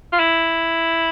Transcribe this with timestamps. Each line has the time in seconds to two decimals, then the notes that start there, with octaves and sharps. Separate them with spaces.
0.13 F4
0.19 E4